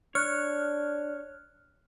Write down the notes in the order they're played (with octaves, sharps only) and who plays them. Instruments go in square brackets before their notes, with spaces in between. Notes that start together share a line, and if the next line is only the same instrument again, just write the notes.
[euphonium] D4 [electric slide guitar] C#5 [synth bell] F6 F#6